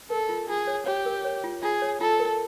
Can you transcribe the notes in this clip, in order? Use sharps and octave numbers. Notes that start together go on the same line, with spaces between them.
A4 A#4
F4
F4 G#4
C#5
G4 C#5
A#4
C#5
F4
F4 G#4
C#5
F4 A4
A#4